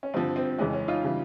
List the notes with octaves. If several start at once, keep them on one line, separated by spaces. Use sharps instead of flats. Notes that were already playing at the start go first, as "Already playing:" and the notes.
C#4
G2 D3 F3 C4
C4
F2 C#3 E3 G#3 C#4
C#4
D#4 F4
C#3 E3 G3